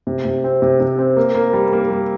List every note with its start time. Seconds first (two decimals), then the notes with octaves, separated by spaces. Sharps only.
0.07 C3
0.25 C3
0.44 C4
0.62 C3
0.80 C3
0.98 C4
1.16 A#3
1.35 A#3
1.53 G3
1.73 A#3
1.90 G3